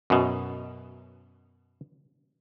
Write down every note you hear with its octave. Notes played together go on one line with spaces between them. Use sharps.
F#2 B2